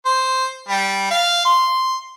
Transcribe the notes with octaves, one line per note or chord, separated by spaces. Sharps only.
C5
G3
F5
C6